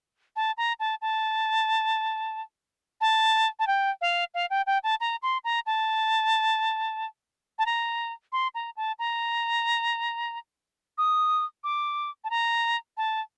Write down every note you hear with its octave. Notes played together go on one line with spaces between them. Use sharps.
A5
A#5
A5
A5
A5
A5
G5
F5
F5
G5
G5
A5
A#5
C6
A#5
A5
A5
A#5
C6
A#5
A5
A#5
D#6
D6
A5
A#5
A5